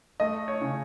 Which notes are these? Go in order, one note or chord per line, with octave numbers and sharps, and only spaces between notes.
A3 D#5
C#5
C#3